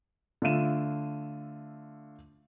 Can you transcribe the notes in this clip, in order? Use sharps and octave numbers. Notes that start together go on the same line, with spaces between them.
D3 A3 F4 E5 D#7 E7